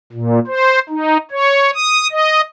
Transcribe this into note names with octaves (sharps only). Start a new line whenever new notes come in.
A#2
C5
D#4
C#5
D#6
D#5